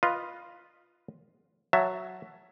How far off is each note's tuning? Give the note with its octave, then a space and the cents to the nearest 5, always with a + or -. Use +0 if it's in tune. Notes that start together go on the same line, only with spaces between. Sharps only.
F4 +0 B4 +0 D#5 +0
F#3 +0 E5 +15 A5 +0